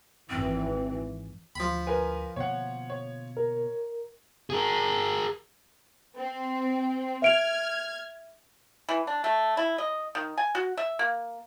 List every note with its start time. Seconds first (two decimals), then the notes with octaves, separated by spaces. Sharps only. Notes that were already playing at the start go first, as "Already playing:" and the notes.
0.30 G#1 E3 C4
1.56 D2 F3 B5
1.87 A#4 B4 G#5
2.36 B2 D3 A#3 C#5 F#5
2.90 C#5
3.37 A#4
4.50 G#4 A#4
6.17 C4
7.22 E5 F6 G#6 D7 F7
8.89 E3
9.07 D4
9.24 A3
9.57 E4
9.78 D#5
10.15 D#3
10.38 G#5
10.55 F#4
10.77 E5
10.99 A#3